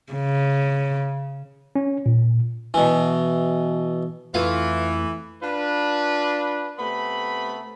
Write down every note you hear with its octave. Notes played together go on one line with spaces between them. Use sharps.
C#3
C#4
A#2
B2 E3
F2 E3 A3 E4 F4 B4
D4 F4 B4
C3 A3 B3 B5